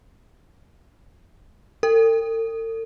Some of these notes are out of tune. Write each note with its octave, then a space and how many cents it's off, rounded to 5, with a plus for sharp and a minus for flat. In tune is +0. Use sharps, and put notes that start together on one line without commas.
A4 +45